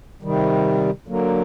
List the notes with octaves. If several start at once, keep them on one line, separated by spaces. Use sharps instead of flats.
C3 D#3 G3
D3 F#3 A#3